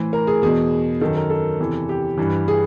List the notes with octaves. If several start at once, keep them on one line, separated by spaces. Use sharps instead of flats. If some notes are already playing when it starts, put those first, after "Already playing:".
Already playing: A2 E3 C5
A#4
G#4
E2 B2 G#4
F#2 D#3 A4
A#4
A4
E2 C3 E3
G4
G2 E3
G#4